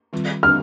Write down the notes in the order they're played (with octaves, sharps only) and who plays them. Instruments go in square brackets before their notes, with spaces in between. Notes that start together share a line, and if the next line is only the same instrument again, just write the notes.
[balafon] D#3 G3 C4 F4
[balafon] D3 G3 C4 [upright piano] F6